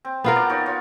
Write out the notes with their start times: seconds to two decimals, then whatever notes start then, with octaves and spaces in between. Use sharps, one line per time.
0.05 C4
0.24 B3 F4 A#4
0.36 F#4 D5
0.49 D#4 F#4 C#5
0.66 F4 C#5